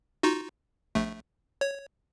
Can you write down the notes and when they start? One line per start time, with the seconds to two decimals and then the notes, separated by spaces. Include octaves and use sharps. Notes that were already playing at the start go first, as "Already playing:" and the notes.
0.23 D#4 F4 F#4
0.95 A#1 A3
1.61 C#5